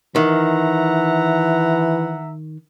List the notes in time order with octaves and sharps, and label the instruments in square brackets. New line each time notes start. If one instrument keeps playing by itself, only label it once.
[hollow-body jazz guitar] D#3 [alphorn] E3 [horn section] E5 F#5 A#5